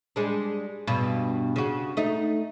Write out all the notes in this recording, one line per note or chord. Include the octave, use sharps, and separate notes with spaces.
G3 G#3 D4
G2 B2
C#3 F#4
A3 D#4